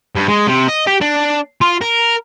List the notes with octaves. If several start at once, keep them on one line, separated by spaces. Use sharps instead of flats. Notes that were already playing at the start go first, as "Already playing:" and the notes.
G2
G#3
C3
D#5
G4
D4
F4
A#4